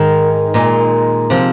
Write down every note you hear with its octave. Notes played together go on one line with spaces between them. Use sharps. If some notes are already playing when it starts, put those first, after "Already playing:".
Already playing: G#2 D#3 G#3 D#4
A#2 G#3 D#4
C3 F3